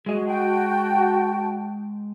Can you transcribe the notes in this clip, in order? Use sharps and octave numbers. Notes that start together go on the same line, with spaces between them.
G#3 F#4 G#4 D#5 G#5
F#4 G5 A5